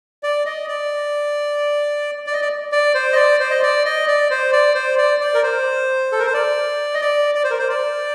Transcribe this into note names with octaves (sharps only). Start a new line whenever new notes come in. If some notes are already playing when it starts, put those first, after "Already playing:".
D5
D#5
D5
D5
D#5
D5
D5
C5
D#5
D5
C5
D#5
D5
D#5
D5
C5
D5
C5
D5
D5
A#4
C5
A4
A#4
C5
D5
D#5
D5
D5
C5
A#4
C5
D5